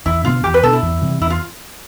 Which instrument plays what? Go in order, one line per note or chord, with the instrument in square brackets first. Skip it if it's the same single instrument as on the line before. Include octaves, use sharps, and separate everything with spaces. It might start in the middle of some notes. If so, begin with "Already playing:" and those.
[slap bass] E2 [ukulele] E4
[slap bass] B2 B3 D4 [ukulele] F4
[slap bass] E2 [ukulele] G4
[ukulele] B4
[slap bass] B2 B3 D4 [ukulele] A4
[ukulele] E4
[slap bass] E2
C3 E3 G3
[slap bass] E2 [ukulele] E4
[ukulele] F4